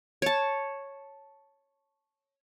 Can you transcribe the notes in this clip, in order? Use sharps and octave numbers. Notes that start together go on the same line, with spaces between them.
C#5 A5